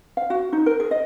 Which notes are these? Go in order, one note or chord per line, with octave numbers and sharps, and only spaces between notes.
F5
F#4
D#4
A#4
G#4
D#5